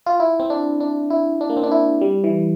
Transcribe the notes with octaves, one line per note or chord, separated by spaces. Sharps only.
F4
E4
C4
D4
D4
E4
D4
A#3
C4
D4
E4
G3
E3